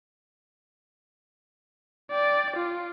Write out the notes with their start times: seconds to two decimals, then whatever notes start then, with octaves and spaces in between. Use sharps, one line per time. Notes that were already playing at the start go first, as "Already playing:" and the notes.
2.11 D5 G5
2.56 F4